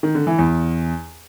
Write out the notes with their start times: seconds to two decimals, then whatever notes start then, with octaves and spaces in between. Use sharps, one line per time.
0.03 D#3
0.15 D3
0.27 E3
0.39 E2